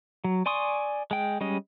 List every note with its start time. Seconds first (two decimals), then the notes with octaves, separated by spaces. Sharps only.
0.24 F#3
0.46 D5 G#5 C6 C#6 D#6
1.11 G#3 G5
1.41 G3 G#3 C#4 D#5